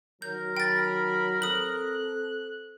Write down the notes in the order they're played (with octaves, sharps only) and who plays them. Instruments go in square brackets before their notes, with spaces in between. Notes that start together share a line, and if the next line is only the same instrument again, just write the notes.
[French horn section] D#3 F#3 [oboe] A#4 [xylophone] G6
[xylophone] G5 A6 [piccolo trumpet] B5
[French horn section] C4 A4 [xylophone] D#6 F#7 [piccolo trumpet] F#6